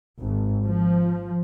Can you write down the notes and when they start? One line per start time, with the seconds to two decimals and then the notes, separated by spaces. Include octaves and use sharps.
0.20 G#1
0.65 F3